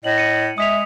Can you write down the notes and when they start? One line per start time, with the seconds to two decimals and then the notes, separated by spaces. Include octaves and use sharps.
0.04 A2 D#5 F#7
0.18 C#7 D#7
0.58 G#3 E5 D#6 B6 F7